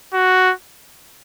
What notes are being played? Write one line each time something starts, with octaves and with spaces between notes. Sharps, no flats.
F#4